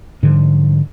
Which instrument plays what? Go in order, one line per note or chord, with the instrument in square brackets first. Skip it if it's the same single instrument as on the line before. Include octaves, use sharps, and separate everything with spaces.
[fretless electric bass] G#2 D3 F3 G3